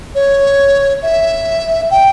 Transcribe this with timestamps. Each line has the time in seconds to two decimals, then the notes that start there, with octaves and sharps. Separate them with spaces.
0.15 C#5
1.03 E5
1.91 G5